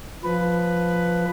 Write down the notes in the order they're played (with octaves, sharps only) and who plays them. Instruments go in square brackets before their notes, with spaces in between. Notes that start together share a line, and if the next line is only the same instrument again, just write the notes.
[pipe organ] F3 B4